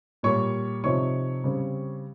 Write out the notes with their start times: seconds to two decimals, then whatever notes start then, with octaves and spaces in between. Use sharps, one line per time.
0.23 A#2 G3 A#3 C#5 C#6
0.84 C3 F3 C4 D#4 C#5 C#6
1.44 C#3 G3 C4